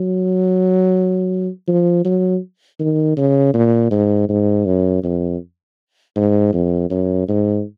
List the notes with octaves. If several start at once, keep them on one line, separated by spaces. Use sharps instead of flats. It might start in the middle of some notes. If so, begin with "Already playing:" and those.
Already playing: F#3
F3
F#3
D#3
C#3
A#2
G#2
G#2
F#2
F2
G#2
F2
F#2
G#2